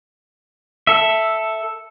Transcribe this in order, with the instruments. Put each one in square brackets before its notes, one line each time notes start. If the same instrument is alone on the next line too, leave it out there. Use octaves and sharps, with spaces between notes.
[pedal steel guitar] A4 E5